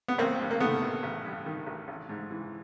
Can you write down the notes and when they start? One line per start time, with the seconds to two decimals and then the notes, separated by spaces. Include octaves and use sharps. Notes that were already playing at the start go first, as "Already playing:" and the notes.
0.08 B3
0.18 A1 A#3 C4
0.39 G2
0.51 A#3
0.60 D#3 A3 B3
0.82 A1
1.03 A1
1.25 G2
1.46 D#3
1.67 A1
1.88 A1
2.09 G#2
2.31 E3